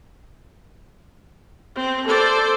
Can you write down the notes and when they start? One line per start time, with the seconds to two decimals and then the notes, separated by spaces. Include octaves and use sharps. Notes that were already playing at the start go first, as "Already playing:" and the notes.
1.75 C4
2.08 A4 C5 D5